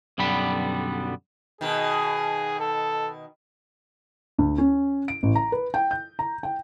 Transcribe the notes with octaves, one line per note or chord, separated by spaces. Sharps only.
B1 F#2 D3 G3 B3 B5
B2 D#3 G#4
A4
D2
C#4
D7
A1
A#5
B4
G5
G6
A#5
G5